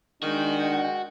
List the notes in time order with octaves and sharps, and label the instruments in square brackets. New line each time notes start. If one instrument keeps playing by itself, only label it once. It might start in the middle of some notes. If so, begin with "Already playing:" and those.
[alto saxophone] D#3 [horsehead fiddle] G#3 G5 [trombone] D4 [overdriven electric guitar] F#4